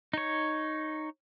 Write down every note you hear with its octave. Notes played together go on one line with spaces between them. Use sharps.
D#4 C#5